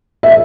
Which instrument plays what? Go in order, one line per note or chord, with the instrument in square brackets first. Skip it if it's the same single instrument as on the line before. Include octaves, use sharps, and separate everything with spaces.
[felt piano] E5